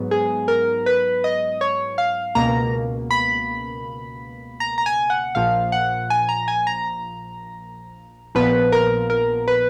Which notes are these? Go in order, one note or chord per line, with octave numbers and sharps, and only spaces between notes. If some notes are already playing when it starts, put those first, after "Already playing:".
Already playing: G#2 F#3 B3
G#4
A#4
B4
D#5
C#5
F5
C#2 B2 A#3 A#5
B5
A#5
A#5
G#5
F#5
A#1 A#2 F3 F5
F#5
G#5
A#5
G#5
A#5
A#1 A#2 F3 B3 B4
A#4
A#4
B4